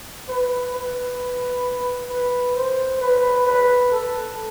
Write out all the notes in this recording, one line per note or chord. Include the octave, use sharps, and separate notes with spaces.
B4
B4
B4
C5
B4
B4
A4